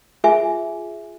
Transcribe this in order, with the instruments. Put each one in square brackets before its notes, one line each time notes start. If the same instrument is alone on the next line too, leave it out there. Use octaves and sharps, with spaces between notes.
[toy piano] F4 G#4 E5 G#5